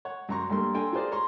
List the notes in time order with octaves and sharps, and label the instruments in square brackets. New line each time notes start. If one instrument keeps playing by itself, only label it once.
[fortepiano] C#5 F#5
F#2 F#4 A#5 C6 C#6
G2 G3 A3 A#3 C6
D4 A4 G5 G#5 A#5 C6
F4 G#4 A#4 C5 D5
C#5 A#5 C6 C#6